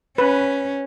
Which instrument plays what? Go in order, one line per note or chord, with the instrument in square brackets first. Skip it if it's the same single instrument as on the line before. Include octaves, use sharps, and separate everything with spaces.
[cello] C#4 [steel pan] B4